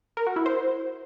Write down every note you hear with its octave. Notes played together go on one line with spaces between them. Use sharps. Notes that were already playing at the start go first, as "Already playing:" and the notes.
A#4
F#4
E4
C5